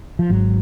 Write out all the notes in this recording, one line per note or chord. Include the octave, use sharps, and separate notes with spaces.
F3
G#1 G#2 F#3